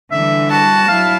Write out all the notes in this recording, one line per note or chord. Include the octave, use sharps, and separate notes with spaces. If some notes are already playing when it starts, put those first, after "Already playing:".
D3 E3 G3 E5
F#4 A5
F#3 E4 F5